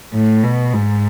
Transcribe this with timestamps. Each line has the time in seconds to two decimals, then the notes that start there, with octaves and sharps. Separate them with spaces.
0.14 A2
0.44 B2
0.73 G#2